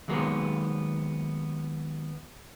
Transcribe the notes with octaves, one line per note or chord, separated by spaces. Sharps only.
D#2 F#3 G#3 A#3 B3